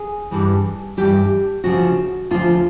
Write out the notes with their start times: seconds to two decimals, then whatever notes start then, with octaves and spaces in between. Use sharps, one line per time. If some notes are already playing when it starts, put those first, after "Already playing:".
Already playing: G#4
0.31 G2 E3 G3
0.97 G2 E3 G3 G4
1.64 D2 C#3 F3 F#4
2.31 D2 C#3 F3 F4